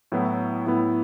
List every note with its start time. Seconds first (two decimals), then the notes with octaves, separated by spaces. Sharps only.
0.12 A2 F#3 B3 E4
0.67 A2 F#3 B3 E4